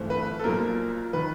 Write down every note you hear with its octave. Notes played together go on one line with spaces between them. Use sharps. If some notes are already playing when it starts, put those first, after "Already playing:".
Already playing: G1 G2 E3 A3 C4
B4
A4
B1 A#2 F3 A#3 A#4
D#3 B4